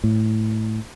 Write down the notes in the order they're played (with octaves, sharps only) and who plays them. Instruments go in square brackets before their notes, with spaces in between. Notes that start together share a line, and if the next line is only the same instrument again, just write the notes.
[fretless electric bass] A2